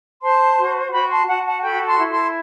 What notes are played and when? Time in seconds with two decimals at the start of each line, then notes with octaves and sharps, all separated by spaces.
0.23 C5 A5 C6
0.58 F#4
0.93 F#4 G5 B5
1.10 A5 C6
1.27 F#4 F#5 A5
1.45 F#5 A5
1.62 A4 G5 B5
1.86 A5 C6
1.99 E4
2.10 A5 C6